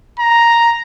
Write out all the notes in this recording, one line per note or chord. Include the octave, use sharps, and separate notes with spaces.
A#5